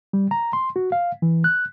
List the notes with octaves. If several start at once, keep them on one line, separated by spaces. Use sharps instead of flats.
G3
A#5
C6
F#4
F5
E3
F#6